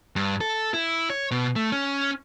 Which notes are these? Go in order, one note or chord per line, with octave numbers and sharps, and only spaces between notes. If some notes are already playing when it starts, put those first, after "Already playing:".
G2
A4
E4
C#5
B2
A3
C#4